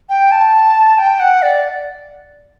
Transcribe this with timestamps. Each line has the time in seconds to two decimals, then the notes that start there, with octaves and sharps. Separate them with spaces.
0.09 G5
0.31 A5
0.98 G5
1.20 F#5
1.42 D5